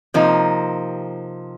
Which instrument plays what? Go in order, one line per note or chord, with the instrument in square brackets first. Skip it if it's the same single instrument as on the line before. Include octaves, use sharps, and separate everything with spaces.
[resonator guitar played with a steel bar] C3 F3 A#3 D#4